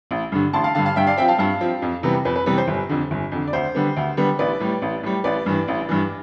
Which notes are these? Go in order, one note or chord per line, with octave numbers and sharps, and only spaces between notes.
A1
G2 D3
A1 A5 C6
F5 A5
G2 D3 F5 A5
F5 A5
G2 E5 G5
D5 F5
F3 C4 E5 G5
F5 A5
G2 F5 A5
F3 C4
F2
C3 E3 G3 B3
F2 B4
B4
C3 E3 G3 B3 B4
C5
G1
F2 D3
G1
F2 D3
D5
D2 C5
D3 G3 B3
D2
D3 G3 B3
A1 B4 D5
A2 G3
A1
A2 G3
A1 B4 D5
G2 E3
A1
G2 E3